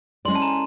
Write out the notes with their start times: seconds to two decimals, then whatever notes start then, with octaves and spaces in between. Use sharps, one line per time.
0.25 G#3 C#4 E4 A4 D5 C6
0.35 A5
0.42 A#5